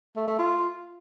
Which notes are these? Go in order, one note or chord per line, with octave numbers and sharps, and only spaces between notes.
A3
A3
F4